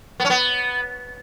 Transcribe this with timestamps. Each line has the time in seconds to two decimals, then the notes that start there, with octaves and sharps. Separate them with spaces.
0.20 B3
0.25 C#4
0.30 B3